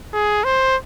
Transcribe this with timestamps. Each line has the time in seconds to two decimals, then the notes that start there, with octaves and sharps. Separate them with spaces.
0.14 G#4
0.44 C5